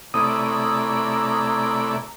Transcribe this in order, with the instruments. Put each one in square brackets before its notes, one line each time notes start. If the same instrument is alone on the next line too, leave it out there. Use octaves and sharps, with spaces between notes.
[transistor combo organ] C3 A3 D5 [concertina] E4 C#5 E6 [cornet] A#5 [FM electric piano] D#6